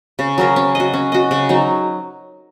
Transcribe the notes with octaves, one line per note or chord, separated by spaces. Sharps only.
C#3
F#3 C#4 A#4
C#4
F#4 D#5
C#4
F#4 D#5
C#3
F#3 D#4